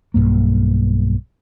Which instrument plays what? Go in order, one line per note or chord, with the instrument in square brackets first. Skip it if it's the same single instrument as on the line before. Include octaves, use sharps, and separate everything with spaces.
[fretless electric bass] B1 E2 G2 A#3